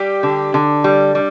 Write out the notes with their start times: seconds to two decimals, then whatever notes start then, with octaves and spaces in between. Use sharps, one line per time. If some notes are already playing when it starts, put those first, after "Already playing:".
Already playing: G3 G4
0.23 D3
0.54 D3
0.84 G3
1.15 G3